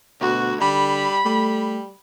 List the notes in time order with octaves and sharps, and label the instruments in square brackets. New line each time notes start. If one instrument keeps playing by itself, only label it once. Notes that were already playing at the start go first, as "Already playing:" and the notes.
[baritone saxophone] D2 [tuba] B2 [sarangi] F#4
[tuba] D3 [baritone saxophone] G3 [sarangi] B5
[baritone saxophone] G3 [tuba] A3